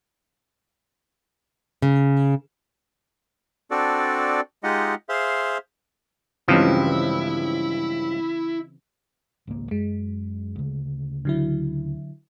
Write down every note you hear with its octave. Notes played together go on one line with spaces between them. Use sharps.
C#3
C4 D4 F#4 A4 D5
G#3 D#4 F4 G4 D#5 F#5
G#4 C5 E5 F5 C6
C#2 G2 C#3 E3 F3 C4 E4
G#1 C#2 A#3
F#2 G#3
D2 C#3
D3 F#3 E4